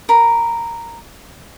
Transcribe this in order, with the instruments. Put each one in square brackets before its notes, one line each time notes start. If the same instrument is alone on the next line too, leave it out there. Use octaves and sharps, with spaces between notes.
[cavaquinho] A#4 B5